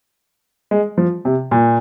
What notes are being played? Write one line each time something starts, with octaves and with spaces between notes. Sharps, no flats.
G#3
F3
C3
A#2